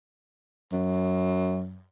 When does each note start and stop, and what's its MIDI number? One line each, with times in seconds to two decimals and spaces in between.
0.72 1.85 42